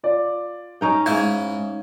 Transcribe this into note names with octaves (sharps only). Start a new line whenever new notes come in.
F4 D5
C#4 D#4 G5
G#2 E4 F5 G#6